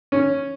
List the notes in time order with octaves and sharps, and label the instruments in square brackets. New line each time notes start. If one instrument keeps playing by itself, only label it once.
[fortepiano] C#4